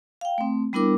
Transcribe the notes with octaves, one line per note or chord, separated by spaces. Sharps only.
F5 G5
A3 C4
G3 B3 D4 E4 A#4 D6